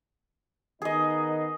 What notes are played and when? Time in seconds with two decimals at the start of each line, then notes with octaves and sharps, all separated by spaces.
0.82 D#3 B3 D#4 G#4 D#5